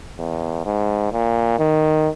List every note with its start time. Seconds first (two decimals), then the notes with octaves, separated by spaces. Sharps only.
0.18 E2
0.66 G#2
1.12 A#2
1.59 D#3